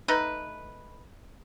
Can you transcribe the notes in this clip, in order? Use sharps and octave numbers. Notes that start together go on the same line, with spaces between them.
A3 D#4 B4